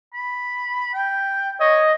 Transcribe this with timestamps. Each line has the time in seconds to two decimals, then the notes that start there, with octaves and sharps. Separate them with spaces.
0.13 B5
0.94 G5
1.60 C#5 D#5